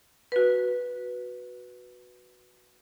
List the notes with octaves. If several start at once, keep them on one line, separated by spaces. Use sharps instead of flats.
F#4 B4